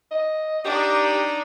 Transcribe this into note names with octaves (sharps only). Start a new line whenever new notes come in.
D#5
D4 D#4 G4